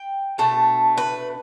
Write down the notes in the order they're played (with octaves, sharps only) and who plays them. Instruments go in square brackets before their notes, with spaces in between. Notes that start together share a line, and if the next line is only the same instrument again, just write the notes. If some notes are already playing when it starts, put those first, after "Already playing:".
Already playing: [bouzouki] G5
B2 A3 D4 A5
B4